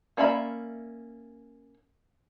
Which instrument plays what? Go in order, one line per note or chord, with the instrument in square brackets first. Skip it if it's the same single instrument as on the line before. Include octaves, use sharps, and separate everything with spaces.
[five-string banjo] A#3 C#4 D5 E5 B5